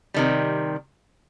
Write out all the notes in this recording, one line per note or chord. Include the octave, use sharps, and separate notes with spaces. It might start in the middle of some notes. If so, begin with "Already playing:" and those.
C3 D#3 G3